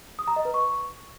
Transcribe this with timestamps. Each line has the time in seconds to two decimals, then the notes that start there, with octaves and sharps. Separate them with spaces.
0.19 D#6
0.28 A#5
0.36 D#5
0.45 B4
0.54 C#6